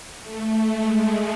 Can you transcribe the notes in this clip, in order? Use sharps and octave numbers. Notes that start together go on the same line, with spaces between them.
A3
G#3